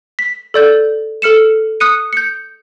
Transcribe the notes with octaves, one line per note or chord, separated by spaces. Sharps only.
B6
A4 D5 G6
A4 F6 C#7 E7
D#6 F#6 C#7 D#7
G6 C#7